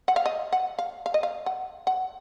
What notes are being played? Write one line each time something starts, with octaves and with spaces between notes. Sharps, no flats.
F#5
F5
D#5
F#5
F5
F5
D#5
F5
F#5
F#5